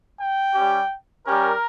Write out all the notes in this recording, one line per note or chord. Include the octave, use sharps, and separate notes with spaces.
G5
G3 C#4 G4
G3 C#4 G4 A#4